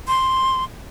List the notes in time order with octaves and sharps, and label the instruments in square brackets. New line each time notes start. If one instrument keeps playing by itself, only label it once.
[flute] C6